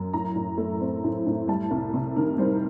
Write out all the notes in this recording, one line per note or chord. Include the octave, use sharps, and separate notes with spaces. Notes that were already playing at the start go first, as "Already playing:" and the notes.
Already playing: F#2
A2 A#5
A2
A3
C4
A2
A2
G3 A5
C2
C3
D#3 A#4
G3 C5